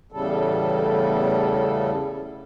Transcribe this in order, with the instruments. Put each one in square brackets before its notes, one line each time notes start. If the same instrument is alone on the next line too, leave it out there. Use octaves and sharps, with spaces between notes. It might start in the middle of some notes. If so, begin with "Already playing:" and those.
[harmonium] E2 A2 C#3 G3 A4